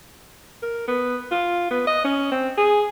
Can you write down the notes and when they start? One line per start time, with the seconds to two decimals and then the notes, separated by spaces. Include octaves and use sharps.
0.62 A#4
0.88 B3
1.31 F4
1.71 B3
1.87 D#5
2.04 C#4
2.32 C4
2.57 G#4